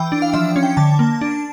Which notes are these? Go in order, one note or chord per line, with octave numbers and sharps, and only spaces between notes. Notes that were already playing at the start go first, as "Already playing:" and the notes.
Already playing: E3 G5
D4
F5
F3 E5
C#4
G5
D3 A5
A#3
D4